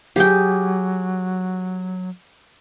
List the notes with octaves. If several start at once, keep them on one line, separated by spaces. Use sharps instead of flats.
F#3 G4 G#4 G5